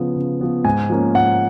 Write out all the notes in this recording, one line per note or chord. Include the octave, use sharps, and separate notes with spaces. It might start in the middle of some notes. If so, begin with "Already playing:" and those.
Already playing: C#3 F3 B3
C#3
F3 B3
G#2 G#5
F3 A#3 C#4
G#2 F#5